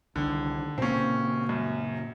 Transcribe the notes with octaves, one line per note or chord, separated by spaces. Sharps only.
C2 D3 D#3
A#2 C#3 A#3 C4 C#4
F#2